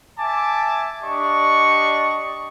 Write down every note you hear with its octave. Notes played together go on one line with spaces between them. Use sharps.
E5 G#5 A5 D6
D4 G4 D5 D#5 C#6